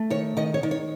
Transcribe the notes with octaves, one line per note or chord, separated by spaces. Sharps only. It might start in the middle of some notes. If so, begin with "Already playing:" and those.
Already playing: A3
D#3 C#5
D#3 D#5
C#5
D#3
C#5